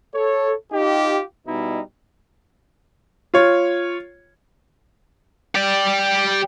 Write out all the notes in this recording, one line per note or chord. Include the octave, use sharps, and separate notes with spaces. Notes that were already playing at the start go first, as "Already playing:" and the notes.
A4 C#5
D#4 F4 G4
B2 G3 D#4 E4
F4 C#5
G4 D5